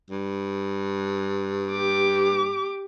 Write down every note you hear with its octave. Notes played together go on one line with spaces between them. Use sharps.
G2
G4 D6